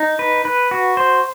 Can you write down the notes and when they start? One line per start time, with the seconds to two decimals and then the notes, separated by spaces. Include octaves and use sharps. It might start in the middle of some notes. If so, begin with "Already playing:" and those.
Already playing: D#4
0.19 B4
0.45 B4
0.71 F#4
0.97 C5